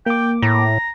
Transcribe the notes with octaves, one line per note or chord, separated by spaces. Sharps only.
A#3 G5 D6
A2 A#5